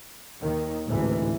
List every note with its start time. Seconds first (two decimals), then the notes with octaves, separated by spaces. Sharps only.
0.40 D#2 D#3
0.86 A1 D2 G#2 C3 E3